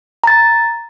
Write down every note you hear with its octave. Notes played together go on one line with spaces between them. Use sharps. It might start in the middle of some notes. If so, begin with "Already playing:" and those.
A#5 A6